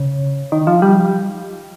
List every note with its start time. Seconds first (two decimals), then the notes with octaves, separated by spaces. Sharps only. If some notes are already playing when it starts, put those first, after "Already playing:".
Already playing: C#3
0.52 D#3
0.67 F3
0.82 G3